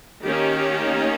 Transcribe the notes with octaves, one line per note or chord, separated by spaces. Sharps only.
D#3 A#3 C#4 G4